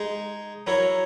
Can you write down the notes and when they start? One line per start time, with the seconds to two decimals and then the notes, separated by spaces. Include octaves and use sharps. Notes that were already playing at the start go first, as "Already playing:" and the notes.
Already playing: G#3 D#4 G#4
0.67 F#3 C#4 E4 A#4 C#5